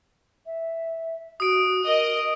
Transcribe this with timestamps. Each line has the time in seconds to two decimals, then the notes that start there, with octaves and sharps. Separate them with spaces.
0.46 E5
1.40 F#4 D#6 D7
1.86 A#4 D#5